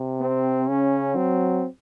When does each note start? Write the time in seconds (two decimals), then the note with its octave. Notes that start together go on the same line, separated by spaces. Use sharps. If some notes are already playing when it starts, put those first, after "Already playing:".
Already playing: C3
0.21 C4
0.69 C#3 C#4
1.16 F#3 C4